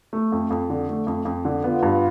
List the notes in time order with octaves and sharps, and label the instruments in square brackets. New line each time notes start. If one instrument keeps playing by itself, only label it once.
[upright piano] A3
F2
F2
D3
A3
F2
F2
D3
[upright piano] B3 [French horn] F4
[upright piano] G2